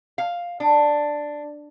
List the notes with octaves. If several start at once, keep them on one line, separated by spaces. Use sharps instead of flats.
F5
D4